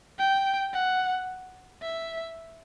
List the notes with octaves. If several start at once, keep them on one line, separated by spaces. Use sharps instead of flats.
G5
F#5
E5